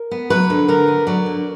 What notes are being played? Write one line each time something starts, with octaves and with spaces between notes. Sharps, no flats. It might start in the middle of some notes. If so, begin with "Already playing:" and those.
Already playing: A#4
B3
F#3 B4
D3
D3 A#4
B3
F#3 D5
D3